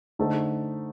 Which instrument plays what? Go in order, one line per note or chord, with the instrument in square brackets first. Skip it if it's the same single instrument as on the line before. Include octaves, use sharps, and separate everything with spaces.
[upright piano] D3 A3 D#4 A4 C5